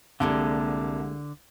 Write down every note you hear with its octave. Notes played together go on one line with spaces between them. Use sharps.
C2 D3 G3 G#3 A#3 A5